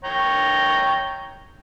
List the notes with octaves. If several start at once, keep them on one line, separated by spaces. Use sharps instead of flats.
C#5 G5 A#5